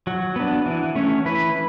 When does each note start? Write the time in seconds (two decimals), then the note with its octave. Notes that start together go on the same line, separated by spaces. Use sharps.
0.07 F#3 F#4
0.36 B3 D4
0.66 E3
0.95 A3 C#4
1.26 E3 B4